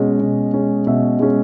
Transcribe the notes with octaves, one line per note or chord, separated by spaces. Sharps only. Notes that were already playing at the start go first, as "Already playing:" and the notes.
Already playing: B2 G#3 C#4 D#5
B2
G#3 C#4
B2 E5
G#3 C#4